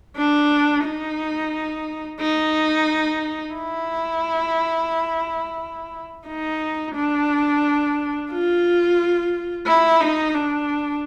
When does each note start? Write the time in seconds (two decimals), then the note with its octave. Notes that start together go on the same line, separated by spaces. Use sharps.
0.16 D4
0.83 D#4
2.20 D#4
3.55 E4
6.27 D#4
6.95 D4
8.31 F4
9.66 E4
10.00 D#4
10.34 D4